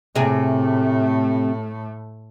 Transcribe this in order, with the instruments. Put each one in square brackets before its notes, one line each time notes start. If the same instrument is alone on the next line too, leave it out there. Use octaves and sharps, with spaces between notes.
[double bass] A2 A3 [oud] C3 G#4